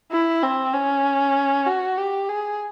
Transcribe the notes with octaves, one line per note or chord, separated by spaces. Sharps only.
E4
C4
C#4
F#4
G4
G#4